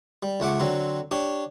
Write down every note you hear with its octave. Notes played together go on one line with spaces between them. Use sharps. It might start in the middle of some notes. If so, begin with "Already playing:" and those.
G3
C#2 A3 F#5 D6
D3 F#3 C4
D4 G4 C#5